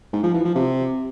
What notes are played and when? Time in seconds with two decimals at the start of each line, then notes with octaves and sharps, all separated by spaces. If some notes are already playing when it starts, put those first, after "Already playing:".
0.13 G#2
0.24 F3
0.34 E3
0.45 F3
0.55 C3